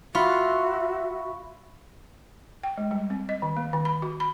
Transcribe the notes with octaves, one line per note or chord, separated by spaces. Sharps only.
F4 F#4 E5 B5 C#6
G5
G#3
G3
C4
D#5
D#3
A#3
D#3
B5
F#4
B5